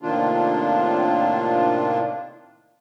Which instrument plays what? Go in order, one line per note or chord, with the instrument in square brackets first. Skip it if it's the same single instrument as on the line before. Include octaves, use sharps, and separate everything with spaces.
[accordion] A2 C3 D#3 A#3 D4 F4